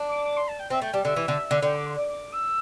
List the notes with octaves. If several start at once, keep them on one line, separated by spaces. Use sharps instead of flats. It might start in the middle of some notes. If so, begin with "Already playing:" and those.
Already playing: D4
D6
D6
C6
A5
G5
C4 E5
A3 G5
G3 A5
D3 E5
E3
D3
D3
D3 G5
D6
C6
D6
D6
E6